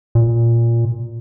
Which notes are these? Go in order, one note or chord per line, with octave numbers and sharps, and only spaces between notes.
A#2